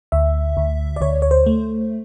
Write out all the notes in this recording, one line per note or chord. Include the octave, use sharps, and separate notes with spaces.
D2 E5
D2
D5
D2 C#5
C#5
C5
A3